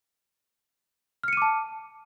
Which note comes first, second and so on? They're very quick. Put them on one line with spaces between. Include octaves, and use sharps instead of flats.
F6 C#7 D#7 D6 A5